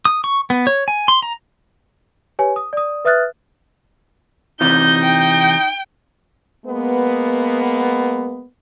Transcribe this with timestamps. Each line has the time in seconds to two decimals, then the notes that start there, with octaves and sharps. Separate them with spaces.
0.05 D#6
0.24 C#6
0.50 B3
0.67 C#5
0.88 G#5
1.08 C6
1.22 A#5
2.39 G4 B4 C#5 G#5
2.56 D#6
2.73 D5 D#6
3.05 B4 E5 D#6 F6 F#6 A6
4.61 C3 E3 D#4 F4 G6
5.04 G5
6.66 G#3 A#3 B3